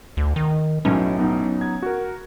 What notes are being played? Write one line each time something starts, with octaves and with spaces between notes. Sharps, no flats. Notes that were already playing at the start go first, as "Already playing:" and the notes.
D2
D#3
B1 F#2 A2 C#4 B4
F#3 B3 D#4
G#6
F#4 A#4